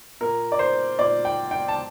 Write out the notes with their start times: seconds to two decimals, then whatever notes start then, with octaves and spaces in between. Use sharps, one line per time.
0.21 A#2 A#4
0.52 D5
0.59 C5
0.99 A#2 D5
1.25 G5
1.51 G5
1.68 A5